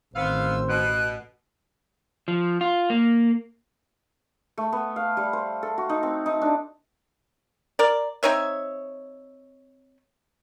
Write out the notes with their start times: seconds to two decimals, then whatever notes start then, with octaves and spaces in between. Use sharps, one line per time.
0.16 A1 D#3 B3 C4 C5 F5 E6
0.69 B2 F#6
2.28 F3
2.61 F4
2.90 A#3
4.57 A3
4.72 B3
4.96 F5
5.17 G3
5.33 C5
5.63 A4
5.78 F#4
5.89 D#4
6.03 C4
6.26 D#4
6.41 D4
7.79 A#4 D5
8.23 C4 D#4 C#5 E5